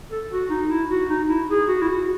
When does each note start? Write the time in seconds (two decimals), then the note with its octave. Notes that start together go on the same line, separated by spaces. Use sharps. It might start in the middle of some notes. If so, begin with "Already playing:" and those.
0.10 A4
0.31 F#4
0.50 D#4
0.69 E4
0.89 F#4
1.09 D#4
1.29 E4
1.49 G#4
1.68 F#4
1.82 E4
1.88 F#4